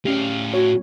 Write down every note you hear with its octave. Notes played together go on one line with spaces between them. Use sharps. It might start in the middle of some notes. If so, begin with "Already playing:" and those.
A2 C#4 G4 F5
F#4 C#5